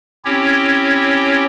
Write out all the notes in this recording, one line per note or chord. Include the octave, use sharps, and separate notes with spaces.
C4 C#4 E4 G4 C#5